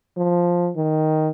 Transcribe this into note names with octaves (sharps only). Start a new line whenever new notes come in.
F3
D#3